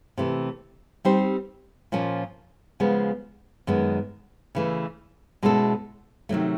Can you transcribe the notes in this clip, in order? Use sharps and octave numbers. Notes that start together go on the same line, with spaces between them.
C3 E3 A3
G3 C4 D#4 G4 C5
A#2 F3 A#3 C#4
C#3 F3 G#3 B3
F#2 D#3 G#3 B3
C#3 E3 A3
B2 G#3 C#4 E4 A4
C3 D#3 F#3 A3